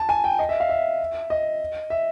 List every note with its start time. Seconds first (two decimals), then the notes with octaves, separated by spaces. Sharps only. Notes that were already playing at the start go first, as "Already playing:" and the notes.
Already playing: A5
0.09 G#5
0.24 G5
0.39 D#5
0.49 E5
0.60 F5
0.69 E5
1.30 D#5
1.90 E5